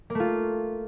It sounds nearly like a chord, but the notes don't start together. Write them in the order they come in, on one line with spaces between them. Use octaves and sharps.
A#3 A3 F4